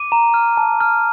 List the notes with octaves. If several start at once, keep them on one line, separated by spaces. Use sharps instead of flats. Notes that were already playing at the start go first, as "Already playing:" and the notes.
Already playing: D6 D#7
A#5
F6
A5
F6